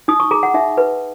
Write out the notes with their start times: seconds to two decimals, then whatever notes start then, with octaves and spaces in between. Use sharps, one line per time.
0.08 D#4 D#6
0.20 C#6
0.31 G#4 A#5
0.43 F#5
0.54 D#4 E5
0.78 B4